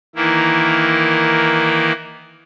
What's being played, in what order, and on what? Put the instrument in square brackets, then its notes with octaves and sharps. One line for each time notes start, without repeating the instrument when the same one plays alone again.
[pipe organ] D#3 E3 A#3 E4